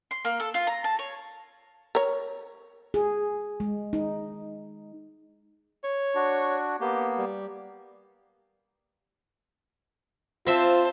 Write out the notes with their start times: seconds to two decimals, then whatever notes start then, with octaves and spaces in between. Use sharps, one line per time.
0.11 C6
0.25 A#3
0.40 A4
0.54 F4
0.67 A#5
0.84 A5
0.99 C#5
1.95 A#4 C#5
2.94 G#4
3.60 G#3
3.93 D#4
5.84 C#5
6.15 D4 F#4
6.81 A#3 B3 G4
7.18 G3
10.47 C4 F4 C5 E5 A5